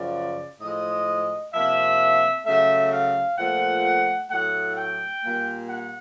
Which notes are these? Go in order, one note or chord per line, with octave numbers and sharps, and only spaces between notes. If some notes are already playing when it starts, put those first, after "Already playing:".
Already playing: F#2 C#3 F3 D5
A2 F3 G#3 D#5
C3 F3 A#3 E5
C#3 F#3 A3 E5
F5
A#2 F3 A3 F#5
A2 F#3 A3 F#5
G5
A#2 G3 A#3
F#5